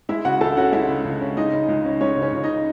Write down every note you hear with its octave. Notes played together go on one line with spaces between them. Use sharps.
G#3 E4 E5
C#3 F#4 F#5
C#2 A4 A5
C#4 F#4 F#5
G#3 E4 E5
C#3
C#2
C#4
G#3 D#4 D#5
C#3
C#2
C#4
G#3 C#4 C#5
C#3
C#4 C#5
C#2
D#4 D#5
C#4